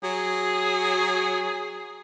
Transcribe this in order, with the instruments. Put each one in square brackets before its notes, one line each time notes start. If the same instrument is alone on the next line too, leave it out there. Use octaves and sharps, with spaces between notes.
[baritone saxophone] F#3 [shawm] G#4